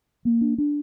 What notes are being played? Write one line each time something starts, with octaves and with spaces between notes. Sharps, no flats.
A#3
D4
D4